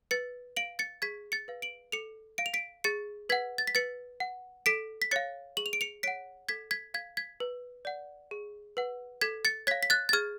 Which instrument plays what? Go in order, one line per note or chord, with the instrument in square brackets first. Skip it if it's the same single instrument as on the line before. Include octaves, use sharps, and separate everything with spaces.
[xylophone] B4 A6 C#7
F5 D7 F#7
A6 C#7
G#4 G#6 B6
A6 C#7
B4 F5
D7 F#7
A4 C#7 F7
F5 D7
F7
B6 D7
G#4 A6 C#7
B4 F#5 G#6 B6
A6
B6
B4 A6 C#7
F#5
A4 B6 D7
B6
C#5 F5 A6 C#7
G#4 F#7
F7
D7
C#7 F7
C#5 F#5 B6 D7
A4 G#6 B6
G#6 B6
F5 G#6 B6
G#6 B6
B4
D5 F#5
G#4
B4 F#5
A4 G#6 B6
A6 C#7
C#5 G#6 B6
F5
B6
F#6 A6
A6
G#4 F6 G#6